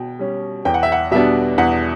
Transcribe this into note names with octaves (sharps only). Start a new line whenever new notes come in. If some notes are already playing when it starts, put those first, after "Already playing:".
Already playing: B2 G5
G3 C#4
E2 G5
F#5
E5
F#5
B2 G3 B3 D4 E5
E2 F#5